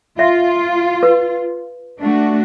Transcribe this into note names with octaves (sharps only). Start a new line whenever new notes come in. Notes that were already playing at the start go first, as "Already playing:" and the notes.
F4 E5
B4
A3 D4 F#4